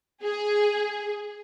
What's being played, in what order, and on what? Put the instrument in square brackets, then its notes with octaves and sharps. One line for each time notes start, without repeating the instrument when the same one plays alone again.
[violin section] G#4